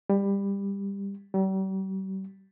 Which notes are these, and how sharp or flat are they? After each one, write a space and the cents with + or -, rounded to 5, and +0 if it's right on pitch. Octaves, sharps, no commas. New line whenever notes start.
G3 +20
G3 -40